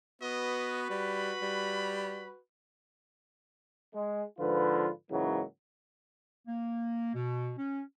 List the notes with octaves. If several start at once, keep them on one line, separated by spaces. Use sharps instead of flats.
B3 F#4 B4 D#5
G3 B5
G3
G#3
G#2 D3 F3 F4 B4
G#2 C#3 E3 F#3 G#3 A#3
A#3
B2
C#4